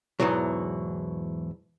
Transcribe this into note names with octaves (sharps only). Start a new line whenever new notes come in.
E2 G#2 B2 E3 F#3